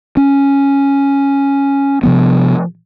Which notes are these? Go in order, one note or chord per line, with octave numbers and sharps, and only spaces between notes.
C#4
C3 F3 B3